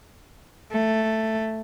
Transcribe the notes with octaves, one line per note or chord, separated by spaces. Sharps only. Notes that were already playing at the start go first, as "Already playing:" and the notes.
A3